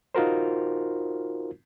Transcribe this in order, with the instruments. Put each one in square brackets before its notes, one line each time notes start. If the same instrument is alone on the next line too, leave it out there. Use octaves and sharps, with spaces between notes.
[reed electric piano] D#4 F4 F#4 A#4 C5